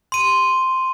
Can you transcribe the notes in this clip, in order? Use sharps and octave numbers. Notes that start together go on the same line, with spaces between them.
C6 D#7